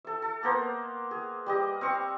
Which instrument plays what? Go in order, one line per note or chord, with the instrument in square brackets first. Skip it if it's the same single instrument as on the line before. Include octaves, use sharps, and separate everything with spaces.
[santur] A4 E5
A4
A#3 B3 A#4 C5
G#4
G3 G4 D#5
C4 F5 C#6